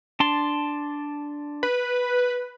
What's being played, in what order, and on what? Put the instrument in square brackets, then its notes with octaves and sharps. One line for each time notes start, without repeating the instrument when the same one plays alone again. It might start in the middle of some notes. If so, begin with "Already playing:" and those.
[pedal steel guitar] D4 A5 C6
[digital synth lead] B4